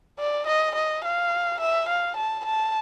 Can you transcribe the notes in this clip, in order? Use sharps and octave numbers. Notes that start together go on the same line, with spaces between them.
D5
D#5
D#5
F5
E5
F5
A5
A5